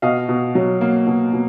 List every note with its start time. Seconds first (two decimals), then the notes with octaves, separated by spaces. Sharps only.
0.02 B2 D#5 F5
0.29 B2
0.55 F#3
0.81 A#3
1.07 B2
1.33 B2